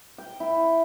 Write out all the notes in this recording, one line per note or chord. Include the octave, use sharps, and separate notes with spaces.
G5
E4